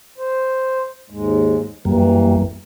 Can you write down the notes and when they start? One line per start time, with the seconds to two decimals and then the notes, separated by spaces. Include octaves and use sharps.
0.18 C5
1.10 D#2 G#2 G#3
1.85 F#2 E3 G3 A#3